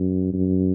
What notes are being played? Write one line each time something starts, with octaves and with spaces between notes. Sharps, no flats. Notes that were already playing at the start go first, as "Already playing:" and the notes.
Already playing: F#2
F#2